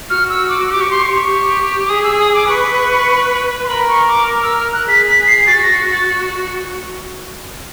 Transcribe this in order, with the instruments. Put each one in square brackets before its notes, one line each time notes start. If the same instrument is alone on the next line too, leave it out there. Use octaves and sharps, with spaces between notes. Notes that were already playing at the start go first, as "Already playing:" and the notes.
[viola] F#4 [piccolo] F6
[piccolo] E6
D6
[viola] G4 [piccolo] D6
[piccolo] C#6
C6
C#6
[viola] G4
[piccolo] D6
[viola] G#4 [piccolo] D#6
[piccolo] E6
D#6
D6
[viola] B4 [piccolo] C#6
[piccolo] C6
[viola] A#4 [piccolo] B5
[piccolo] C#6
D6
E6
F6
F#6
[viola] G#4 [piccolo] B6
[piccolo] B6
C7
[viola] F#4 [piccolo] A6
[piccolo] A#6
A6